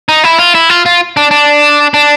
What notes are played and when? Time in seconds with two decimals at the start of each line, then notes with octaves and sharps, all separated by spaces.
0.09 D#4
0.24 E4
0.39 F4
0.55 E4
0.70 F4
0.86 F4
1.17 D4
1.31 D4
1.94 D4